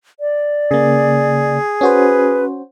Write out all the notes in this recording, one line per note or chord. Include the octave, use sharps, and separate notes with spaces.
D5
C#3 A#3 G#4
C#4 F#4 B4 C5